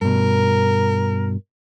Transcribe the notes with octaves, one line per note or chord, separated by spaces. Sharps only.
G2 B2 A#4